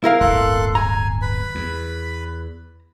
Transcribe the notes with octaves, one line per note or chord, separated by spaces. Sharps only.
E4 A#4 F5
D1 G1 A4 C6 F#6
G#5 A#5
B4 B5
E2